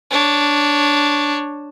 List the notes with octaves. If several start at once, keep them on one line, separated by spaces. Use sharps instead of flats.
D4 C#5